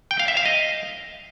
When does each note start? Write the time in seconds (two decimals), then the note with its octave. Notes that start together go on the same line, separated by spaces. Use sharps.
0.11 G5
0.19 F5
0.28 E5
0.37 F5
0.46 D#5